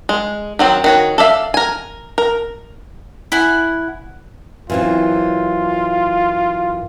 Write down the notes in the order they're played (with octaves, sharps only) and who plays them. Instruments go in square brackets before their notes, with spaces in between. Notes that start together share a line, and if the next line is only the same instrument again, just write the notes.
[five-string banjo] G#3
D#3 F#3 C4
D#3 F#4 C#5
A4 D5 E5 F5
A#4 G#5
A#4
[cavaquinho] E4 F#5 G#5
[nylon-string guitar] F#2 E3 C4 [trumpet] F4